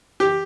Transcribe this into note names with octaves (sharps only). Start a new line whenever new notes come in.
G4